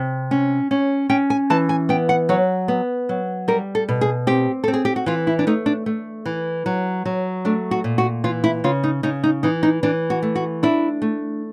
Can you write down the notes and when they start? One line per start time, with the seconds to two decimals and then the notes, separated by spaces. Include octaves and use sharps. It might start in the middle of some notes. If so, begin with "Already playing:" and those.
Already playing: C3
0.31 C#4
0.71 C#4
1.09 C#4 G5
1.30 G#5
1.50 E3 A5
1.69 G#5
1.89 B3 G5
2.09 F#5
2.29 F#3 C#5
2.68 B3
3.09 F#3
3.48 G3 A#4
3.75 A4
3.88 B2
4.01 G#4
4.27 C4 G4
4.64 C4 A4
4.73 G#4
4.85 G4
4.96 F#4
5.06 E3 F4
5.27 E4
5.39 D4
5.47 A3 D#4
5.66 D4
5.86 A3
6.25 E3
6.66 F#3
7.05 F#3
7.45 A3 D4
7.71 F#4
7.84 A#2
7.98 F#4
8.24 E3 F4
8.44 E4
8.64 C#3 F4
8.84 D#4
9.03 C#3 D#4
9.24 D#4
9.43 E3 D#4
9.63 D#4
9.83 E3 D4
10.10 F#4
10.22 A3
10.35 F#4
10.63 D4 E4
11.02 A3